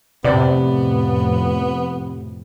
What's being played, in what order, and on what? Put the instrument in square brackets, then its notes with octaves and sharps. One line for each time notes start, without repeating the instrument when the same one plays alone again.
[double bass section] F2 A2 [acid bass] C3 [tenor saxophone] B3 [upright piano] D5